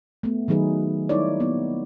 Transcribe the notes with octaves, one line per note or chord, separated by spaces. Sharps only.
A3 B3
D#3 F#3 D#4 G#4 B4
G3 D#4 E4 A#4 C#5 D5
A#3 B3 E4